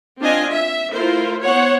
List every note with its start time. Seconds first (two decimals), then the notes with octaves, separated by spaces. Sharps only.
0.20 C4 D4 F4 D#5 G#5
0.52 E5
0.93 A3 E4 F4 A#4 C5
1.43 B3 C5 C#5 F#5